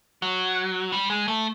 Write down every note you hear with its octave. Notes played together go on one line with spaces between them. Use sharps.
F#3
G3
G#3
A3